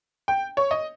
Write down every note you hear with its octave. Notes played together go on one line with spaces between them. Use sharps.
G5
C#5
D#5